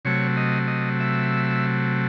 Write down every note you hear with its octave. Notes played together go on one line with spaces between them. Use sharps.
C3 F#3 A3 C#5
D#5
D#5
E5